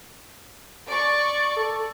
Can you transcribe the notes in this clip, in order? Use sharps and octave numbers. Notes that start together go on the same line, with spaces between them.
D5 C#6
A4